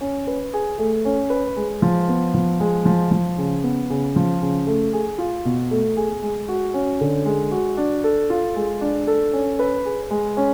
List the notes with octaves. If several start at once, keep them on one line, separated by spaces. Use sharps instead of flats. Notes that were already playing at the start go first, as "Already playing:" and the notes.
C#4
B4
G#4
A3
C#4
B4
G#3
F3
B3
F3
G#3
F3
F3
C#3
B3
C#3
F3
C#3
A3
G#4
F4
B2
A3
G#4
G#3
F#4
C#4
D3
G#3
F#4
D4
A4
F4
G#3
D4
A4
C#4
B4
G#4
G#3
C#4